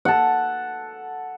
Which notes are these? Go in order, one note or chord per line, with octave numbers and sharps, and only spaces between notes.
A4 F#5